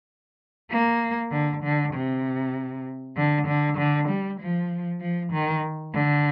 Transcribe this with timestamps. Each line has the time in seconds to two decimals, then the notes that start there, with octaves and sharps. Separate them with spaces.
0.71 A#3
1.31 D3
1.63 D3
1.94 C3
3.17 D3
3.47 D3
3.78 D3
4.08 G3
4.40 F3
5.01 F3
5.32 D#3
5.94 D3